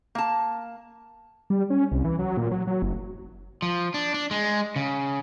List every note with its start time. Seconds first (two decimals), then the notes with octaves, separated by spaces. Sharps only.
0.15 A#3 A5
1.50 G3
1.70 C#4
1.92 C2
2.04 E3
2.19 F#3
2.37 A#2
2.51 F#3
2.67 F#3
2.82 F#1
3.62 F3
3.94 D4
4.14 D4
4.31 G#3
4.76 C#3